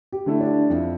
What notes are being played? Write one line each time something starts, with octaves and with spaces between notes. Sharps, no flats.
G4
D3 A3 E4
D4
F2 E4